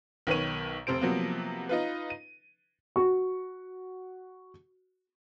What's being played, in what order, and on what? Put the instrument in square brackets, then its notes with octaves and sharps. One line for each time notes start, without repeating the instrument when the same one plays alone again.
[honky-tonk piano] B1 D#3 B4 C#5 D#7
F1 C3 C5 D7
C3 F3 F#3 A#3 B3
D#4 F4 B4
D#7
[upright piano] F#4 C#6